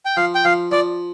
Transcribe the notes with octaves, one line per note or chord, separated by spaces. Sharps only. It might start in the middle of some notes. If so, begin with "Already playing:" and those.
G5
F3 F5
G5
F3 F5
F3 D5